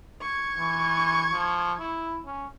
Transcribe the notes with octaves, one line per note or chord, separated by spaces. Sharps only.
C#6 G#6
E3
F3
E4
C#4